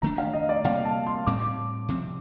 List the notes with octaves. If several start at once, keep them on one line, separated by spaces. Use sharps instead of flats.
D#3 A3 D4 A#5
F5
D#5
D5
C3 G3 A#3 F5
A5
C6
A2 G3 C4 D6
C3 F3 C4